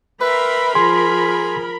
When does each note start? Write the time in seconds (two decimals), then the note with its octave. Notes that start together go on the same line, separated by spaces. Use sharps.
0.21 A#4 B4 E5 G5 B5 C6
0.75 F3 G#4 C6